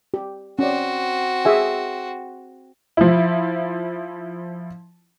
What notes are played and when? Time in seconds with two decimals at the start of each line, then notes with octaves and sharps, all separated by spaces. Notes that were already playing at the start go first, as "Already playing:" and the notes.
0.14 G4
0.59 C4 C#4 F#4 D5
1.45 G#4 E5 G#5
2.97 F3 E4